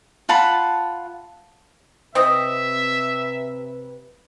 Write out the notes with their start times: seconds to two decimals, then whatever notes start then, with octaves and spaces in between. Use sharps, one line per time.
0.29 F4 F#5 A5 B5
2.15 C3 C4 B4 D#5 E5